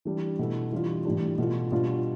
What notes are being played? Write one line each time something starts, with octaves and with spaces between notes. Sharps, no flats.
E3 G3 D4
B2 A3 E4
E3 G3 D4 F4
A2 E3 G3 D4
B2 A3 D4 F4
B2 G3 D4 F4